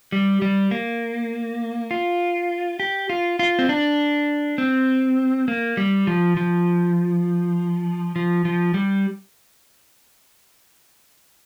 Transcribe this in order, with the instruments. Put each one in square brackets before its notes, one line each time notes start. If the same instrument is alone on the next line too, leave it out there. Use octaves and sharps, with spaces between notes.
[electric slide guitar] G3
G3
A#3
F4
G4
F4
F4
C4
D4
C4
A#3
G3
F3
F3
F3
F3
G3